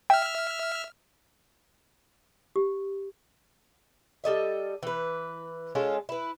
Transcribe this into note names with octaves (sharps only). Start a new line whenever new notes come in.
E5 G5 F6
G4
G3 A4 D#5 E5
E3 B4
G#3 C#4 F4 A4
E4 B4